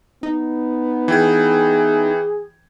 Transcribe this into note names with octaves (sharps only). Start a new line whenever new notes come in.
B3 D#4
E3 G#4 G5 G#6